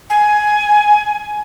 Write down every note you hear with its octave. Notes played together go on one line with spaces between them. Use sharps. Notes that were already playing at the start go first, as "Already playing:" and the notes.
G#5